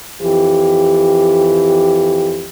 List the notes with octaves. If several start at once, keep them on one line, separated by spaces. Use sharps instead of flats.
F2 E3 G4